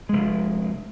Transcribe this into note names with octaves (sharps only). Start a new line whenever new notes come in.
F1 G#3